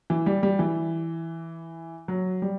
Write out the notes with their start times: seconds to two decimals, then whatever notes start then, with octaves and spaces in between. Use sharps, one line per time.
0.10 E3
0.26 G3
0.43 G3
0.59 E3
2.08 F#3
2.42 G3